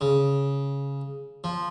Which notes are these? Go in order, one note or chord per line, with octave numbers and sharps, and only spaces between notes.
C#3
F3